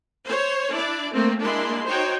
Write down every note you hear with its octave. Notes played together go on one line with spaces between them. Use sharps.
C5 C#5
D4 E4 D5
A3 A#3 C4
G#3 A#3 D4 E4 C6
D#4 F#4 C5 C#5 G5